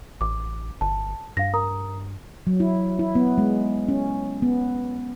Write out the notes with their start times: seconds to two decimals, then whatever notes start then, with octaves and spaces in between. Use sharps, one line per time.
0.21 A1 D6
0.81 G1 A5
1.37 G2 F5 A#6
1.54 A#4 A#5 D#6
2.47 F#3
2.60 E4
2.99 E4
3.15 B3
3.38 G#3
3.89 C#4
4.42 B3